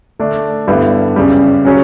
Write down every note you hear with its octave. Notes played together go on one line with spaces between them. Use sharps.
D3 A3 D4
G2 D3 G3 B3 E4
F#2 C#3 G3
C#3 F#3 C#4